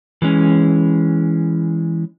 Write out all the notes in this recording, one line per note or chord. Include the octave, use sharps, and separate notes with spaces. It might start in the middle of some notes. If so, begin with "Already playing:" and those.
E3 G#3 C#4